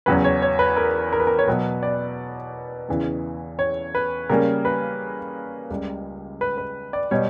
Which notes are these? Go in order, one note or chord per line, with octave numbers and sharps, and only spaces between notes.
E2 C#3 F#3 C#4 B4
C#5
C#5
B4
A#4
A#4
B4
A#4
C#5
B2 F#3 B3 B4
D5
E2 C#3 E3
C#5
B4
C#3 G3 A#3 C#4 A#4
B4
C#2 C#3 G3
B4
B4
D5
B2 G3 C#5